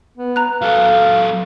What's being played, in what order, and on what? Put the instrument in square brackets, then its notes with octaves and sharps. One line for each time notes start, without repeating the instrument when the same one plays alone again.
[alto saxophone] B3
[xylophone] A#5 F#6
[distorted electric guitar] F#3 A4 [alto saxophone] F5